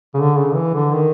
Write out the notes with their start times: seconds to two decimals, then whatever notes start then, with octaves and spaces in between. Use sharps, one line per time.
0.14 C#3
0.17 D3
0.37 C#3
0.55 E3
0.74 D3
0.93 D#3